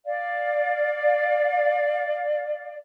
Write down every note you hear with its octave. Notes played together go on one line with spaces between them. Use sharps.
D5 F5